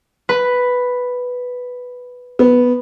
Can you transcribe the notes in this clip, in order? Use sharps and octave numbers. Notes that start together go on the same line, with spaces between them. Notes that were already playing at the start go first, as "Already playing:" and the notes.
B4 B5
B3